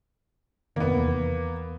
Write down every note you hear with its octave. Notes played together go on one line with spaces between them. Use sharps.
F2 C3 D#3 A#3 B3
E2